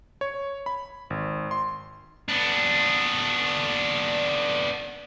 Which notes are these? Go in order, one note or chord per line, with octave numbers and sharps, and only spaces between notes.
C#5
B5
G#1
C6
B3 D4